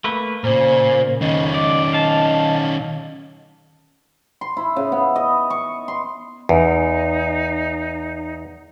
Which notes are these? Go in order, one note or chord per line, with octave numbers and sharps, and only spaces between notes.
A3 A#3 B4
A#2 C#3 A#3 C5
D#3 C#4 D#5
D5 D#5
D#5 F5 A5
C6
E4
C#3
B3
D#5
C#6
C6
E2 D#4